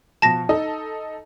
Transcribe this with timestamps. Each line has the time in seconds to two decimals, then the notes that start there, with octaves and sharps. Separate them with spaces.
0.22 B2 F3 A5 A#6
0.49 D#4 A4 D#5